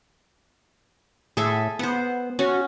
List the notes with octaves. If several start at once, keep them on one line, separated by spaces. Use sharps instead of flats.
A2 G#4 A4 E5
B3 C5 F#5
C#4 F#4